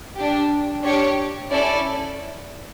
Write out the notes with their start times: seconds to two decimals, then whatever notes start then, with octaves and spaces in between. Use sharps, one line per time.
0.17 D4 G4
0.84 D4 G4 C#5
1.52 C#4 E4 A4 D5